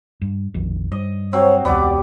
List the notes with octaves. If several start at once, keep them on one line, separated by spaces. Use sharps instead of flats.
G2
F1 A#1 D#3
G2 D#5
F#3 C4 C#5
E1 C#2 B3 G4 D5 D6